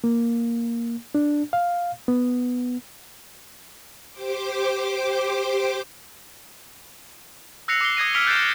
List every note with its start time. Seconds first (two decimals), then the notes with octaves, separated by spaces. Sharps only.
0.04 A#3
1.15 D4
1.53 F5
2.08 B3
4.11 G4 C5 D6
7.68 E6 F#6 A#6 C7 C#7 F7
7.81 D6 C7 G7
7.97 D#6 G#6 A#6 D#7
8.14 E6 F6 B6 D7 F7 G7
8.26 F#6 G6 A6 C7 D7 E7
8.38 C#7